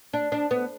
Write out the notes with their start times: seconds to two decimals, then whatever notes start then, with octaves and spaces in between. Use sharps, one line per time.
0.13 D4
0.32 D4
0.51 B3